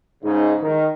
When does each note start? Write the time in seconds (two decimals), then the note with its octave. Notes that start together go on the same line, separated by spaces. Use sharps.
0.23 G#2 C#3 D#4
0.62 D#3